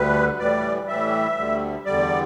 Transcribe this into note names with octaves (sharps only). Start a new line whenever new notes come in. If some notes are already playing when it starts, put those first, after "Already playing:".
Already playing: D2 D3 G3 B4
A2 E3 G3 D5
A2 E3 G3 E5
D2 D3 G3
E2 D3 G3 D5